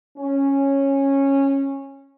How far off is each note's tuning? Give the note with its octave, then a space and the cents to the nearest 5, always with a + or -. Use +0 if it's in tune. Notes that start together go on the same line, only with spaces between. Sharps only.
C#4 -10